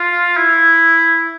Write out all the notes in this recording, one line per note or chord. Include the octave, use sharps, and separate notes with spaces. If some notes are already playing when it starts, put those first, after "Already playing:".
Already playing: F4
E4